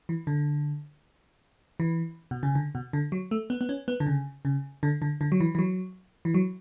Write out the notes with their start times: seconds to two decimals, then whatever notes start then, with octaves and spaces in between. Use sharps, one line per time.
0.09 E3
0.27 D3
1.80 E3
2.31 B2
2.43 C#3
2.55 D3
2.75 B2
2.93 D3
3.12 F#3
3.31 A3
3.50 B3
3.61 B3
3.69 C#4
3.88 B3
4.00 D3
4.07 C#3
4.45 C#3
4.83 D3
5.02 D3
5.21 D3
5.32 F#3
5.40 E3
5.55 E3
5.59 F#3
6.25 E3
6.34 F#3